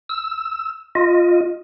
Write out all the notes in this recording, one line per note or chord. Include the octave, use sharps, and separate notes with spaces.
E6
F4 D#5